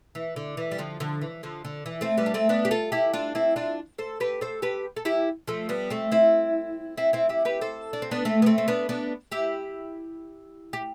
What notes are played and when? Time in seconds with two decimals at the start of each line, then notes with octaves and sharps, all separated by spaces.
0.15 E3
0.36 D3
0.57 E3
0.71 G3
0.78 D3 F3
1.00 D3 F3
1.22 E3
1.43 D3 F3
1.65 D3
1.86 E3
2.01 A3 C4
2.17 G3 B3
2.26 D4
2.34 A3 C4
2.49 B3 D4
2.65 G4
2.71 F4 A4
2.92 E4 G4
3.14 D4 F4
3.35 C4 E4
3.56 D4 F4
3.98 A4 C5
4.20 G4 B4
4.41 A4 C5
4.62 G4 B4
4.97 A4
5.05 E4 G4
5.48 F3 A3
5.69 G3 B3
5.90 A3 C4
6.12 C4 E4
6.98 C4 E4
7.13 C4 E4
7.29 E4 G4
7.45 G4 B4
7.61 A4 C5
7.93 D4
8.02 C4
8.11 B3 D4
8.25 A3 C4
8.42 B3
8.46 A3 C4
8.58 C4
8.68 B3 D4
8.89 B3 D4
9.32 E4 G4
10.73 G4